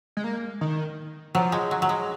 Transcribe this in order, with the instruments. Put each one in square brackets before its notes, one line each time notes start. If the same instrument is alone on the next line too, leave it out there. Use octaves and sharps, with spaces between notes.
[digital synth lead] G#3
A#3
D#3
[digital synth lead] F3 [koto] F#3
[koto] G#3
F#3
F#3
G#3